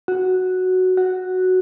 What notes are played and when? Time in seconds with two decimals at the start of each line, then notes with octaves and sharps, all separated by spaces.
0.08 F#4
0.97 F#4